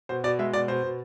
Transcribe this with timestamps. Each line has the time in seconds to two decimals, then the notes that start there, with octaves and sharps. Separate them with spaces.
0.09 B2 C5
0.24 B2 D5
0.39 G#3 E5
0.53 B2 D5
0.68 B2 C5
0.83 B2